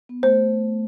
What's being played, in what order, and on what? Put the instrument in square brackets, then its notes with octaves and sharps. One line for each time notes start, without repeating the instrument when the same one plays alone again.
[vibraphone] B3
[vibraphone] A3 [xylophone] C5